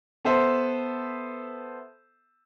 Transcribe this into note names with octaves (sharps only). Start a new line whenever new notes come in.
B3 A4 C5 E5